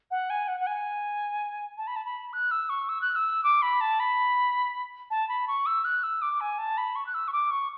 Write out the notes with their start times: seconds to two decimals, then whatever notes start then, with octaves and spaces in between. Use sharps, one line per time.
0.11 F#5
0.30 G#5
0.48 F#5
0.60 F#5
0.67 G#5
1.78 A5
1.87 B5
1.96 A5
2.05 B5
2.33 F#6
2.51 E6
2.69 C#6
2.89 E6
3.01 F#6
3.16 E6
3.44 D6
3.62 B5
3.81 A5
4.00 B5
5.11 A5
5.29 B5
5.48 C#6
5.66 E6
5.85 F#6
6.03 E6
6.22 D6
6.40 G#5
6.58 A5
6.78 B5
6.96 C#6
7.06 F#6
7.14 E6
7.28 C#6
7.33 D6
7.51 C#6